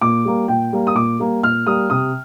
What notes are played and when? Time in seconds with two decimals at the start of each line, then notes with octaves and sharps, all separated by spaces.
0.01 A#2 D6
0.25 G3 A#3
0.48 A#2 G5
0.73 G3 A#3
0.87 D#6
0.95 A#2 D6
1.19 G3 A#3
1.43 A#2 F6
1.67 G3 A#3 D#6
1.90 C3 D#6